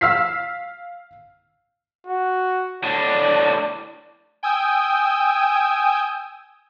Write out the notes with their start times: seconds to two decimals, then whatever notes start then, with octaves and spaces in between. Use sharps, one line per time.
0.01 F5 E6 F6 B6 C7
2.07 F#4
2.83 A2 D4 D5
4.43 G5 G#5 D#6 E6 G6